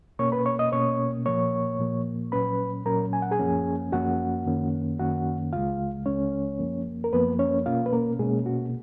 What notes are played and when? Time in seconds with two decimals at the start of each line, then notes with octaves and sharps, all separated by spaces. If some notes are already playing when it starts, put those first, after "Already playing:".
0.19 B2 A#3 C#4 C#5 C#6
0.32 B4 B5
0.46 C#5 C#6
0.59 D#5 D#6
0.72 B2 A#3 C#4 C#5 C#6
1.25 A#2 F3 A#3 C#5 C#6
1.79 A#2 F3 A#3
2.32 A#2 F#3 C#4 B4 B5
2.85 A#2 F#3 C#4 A#4 A#5
3.13 G#5
3.22 F#5
3.31 G#4 G#5
3.39 F#2 F3 A#3 C#4
3.92 F#2 F3 A#3 C#4 F#4 F#5
4.46 F#2 D#3 A#3 C#4
4.99 F#2 D#3 A#3 C#4 F#4 F#5
5.53 C#2 C#3 G#3 F4 F5
6.06 C#2 C#3 G#3 C#4 C#5
6.59 F#2 F3 A#3
7.04 A#4
7.13 F#2 F3 A#3 B3 B4
7.39 C#4 C#5
7.66 B2 A#3 C#4 F4 F5
7.86 B4
7.93 A#3 A#4
8.19 B2 G#3 A#3 C#4 G#4
8.46 F#4